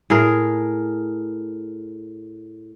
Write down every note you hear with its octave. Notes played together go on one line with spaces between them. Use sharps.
A2 G#4 A#4